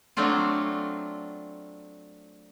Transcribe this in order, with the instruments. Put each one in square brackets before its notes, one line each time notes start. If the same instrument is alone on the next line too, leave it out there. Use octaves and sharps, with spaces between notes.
[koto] F#3 A3 C4 D4 F4